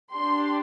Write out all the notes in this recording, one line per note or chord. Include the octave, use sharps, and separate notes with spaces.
D4 G4 C6